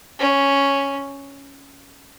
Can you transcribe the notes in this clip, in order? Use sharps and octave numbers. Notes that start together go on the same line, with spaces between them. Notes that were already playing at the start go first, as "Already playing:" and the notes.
C#4